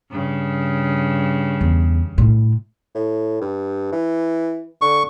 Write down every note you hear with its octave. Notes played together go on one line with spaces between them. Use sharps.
G2 C#3
E2
A2
A2
G2
E3
D3 C#6